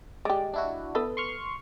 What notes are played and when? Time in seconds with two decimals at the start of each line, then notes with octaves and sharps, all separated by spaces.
0.25 G#3 G4 D5
0.54 D4 E4 F#4
0.95 B3 A4 B4
1.17 C6 C#6 F6